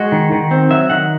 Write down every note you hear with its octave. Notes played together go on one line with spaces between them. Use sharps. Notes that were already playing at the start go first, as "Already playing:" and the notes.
Already playing: G#3 F#4
D#3
D#3
C4
F#3 E5
D#3 F#5